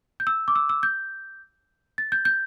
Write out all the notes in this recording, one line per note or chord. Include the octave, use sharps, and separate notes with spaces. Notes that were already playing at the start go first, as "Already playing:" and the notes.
G6
E6
D6
E6
E6
G6
A6
G6
G6